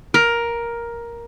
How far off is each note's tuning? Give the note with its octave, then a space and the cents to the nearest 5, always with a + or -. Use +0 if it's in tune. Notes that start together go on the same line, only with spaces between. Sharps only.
A#4 +10